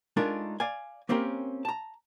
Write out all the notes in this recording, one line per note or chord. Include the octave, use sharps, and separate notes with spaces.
G#3 A3 D4 D#4 F4 A#4
D5 F5 G#5
A#3 C4 C#4 G4 A#4
A5 A#5